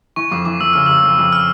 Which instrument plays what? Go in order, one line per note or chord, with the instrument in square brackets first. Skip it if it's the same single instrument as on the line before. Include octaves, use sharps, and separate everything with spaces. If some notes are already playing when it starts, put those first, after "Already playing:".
[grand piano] E3 [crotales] C#6
[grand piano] F2 [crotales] D6
[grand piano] E3 [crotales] D6
[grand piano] F2 [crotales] E6
[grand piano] C#3 [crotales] F6
[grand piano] C#3 [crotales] E6
[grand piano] F2
F2
[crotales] F6